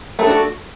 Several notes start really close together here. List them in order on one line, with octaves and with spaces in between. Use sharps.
A3 A4 D4 F#4